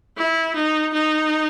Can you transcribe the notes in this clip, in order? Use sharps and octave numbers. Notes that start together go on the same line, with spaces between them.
E4
D#4
D#4